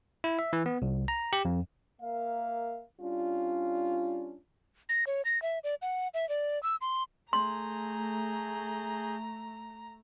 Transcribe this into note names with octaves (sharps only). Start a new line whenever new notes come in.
E4
E5
E3
B3
C2
A#5
G4
F2
A#3 A#4 E5 F5
G3 C#4 D4 F4
A#6
C#5
A#6
E5
D5
F#5
E5
D5
E6
C6
A3 G#4 A#5 C6 G6